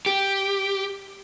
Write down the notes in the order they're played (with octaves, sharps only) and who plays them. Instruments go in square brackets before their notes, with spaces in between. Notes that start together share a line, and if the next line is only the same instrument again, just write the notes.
[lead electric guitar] G4